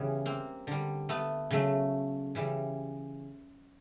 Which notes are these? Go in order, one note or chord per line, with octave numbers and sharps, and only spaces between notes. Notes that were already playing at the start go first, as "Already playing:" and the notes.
Already playing: C#3 E3 G3 B3 C#4
A#3 C4
D3 G3
A3 B3
C#3 F#3 A3
C#3 E3 G3